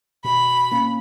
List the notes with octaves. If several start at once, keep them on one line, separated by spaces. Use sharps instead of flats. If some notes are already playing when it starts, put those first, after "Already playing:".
B2 B5
A#3 C#4